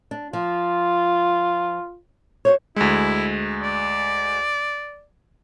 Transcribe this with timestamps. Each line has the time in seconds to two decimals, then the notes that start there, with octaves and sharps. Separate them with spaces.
0.11 D4
0.33 F3 F4
2.45 F#4 C5 C#5
2.76 D2 G#3 E4
3.63 D5